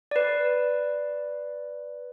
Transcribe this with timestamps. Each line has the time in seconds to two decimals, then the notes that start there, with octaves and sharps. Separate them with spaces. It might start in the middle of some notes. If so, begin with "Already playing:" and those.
0.11 B4 D5